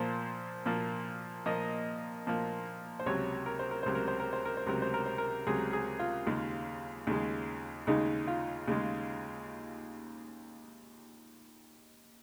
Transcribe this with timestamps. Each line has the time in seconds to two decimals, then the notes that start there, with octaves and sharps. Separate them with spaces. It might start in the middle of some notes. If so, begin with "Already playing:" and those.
Already playing: A#2 F3 A#3 C5
0.66 A#2 F3 A#3
1.46 A#2 F3 A#3 D#5
2.27 A#2 F3 A#3
3.00 C5
3.06 C#2 C3 F#3 C#5
3.46 A#4
3.59 C5
3.71 A#4
3.83 C#2 C3 F#3 C5
3.95 A#4
4.08 C5
4.20 A#4
4.33 C5
4.45 A#4
4.57 C5
4.67 C#2 C3 F#3 A#4
4.82 C5
4.94 A#4
5.06 C5
5.18 A#4
5.47 C#2 C3 F#3 G#4
5.73 G#4
5.99 F4
6.26 D#2 C#3 G#3
7.07 D#2 C#3 G#3
7.87 D#2 C#3 G#3 D#4
8.27 F4
8.68 D#2 C#3 G#3